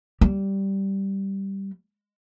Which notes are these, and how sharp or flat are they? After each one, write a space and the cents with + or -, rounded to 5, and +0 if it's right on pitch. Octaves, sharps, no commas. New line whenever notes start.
G3 -5